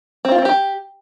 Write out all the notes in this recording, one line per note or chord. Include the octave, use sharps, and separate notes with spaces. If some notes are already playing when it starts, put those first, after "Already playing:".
C4
F4
C4
G4